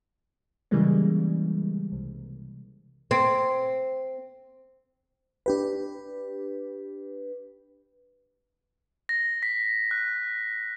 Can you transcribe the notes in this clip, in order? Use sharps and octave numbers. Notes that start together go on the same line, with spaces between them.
C#3 E3 G3 G#3 A#3
C2
C4
D4 G4 B4
A#6
B6
F#6